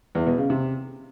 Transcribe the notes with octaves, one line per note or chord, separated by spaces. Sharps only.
E2
B2
C#3
C3